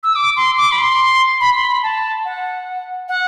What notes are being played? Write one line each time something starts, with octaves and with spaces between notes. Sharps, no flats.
E6
D6
C6
D6
B5
C6
B5
C6
B5
A5
F#5
F#5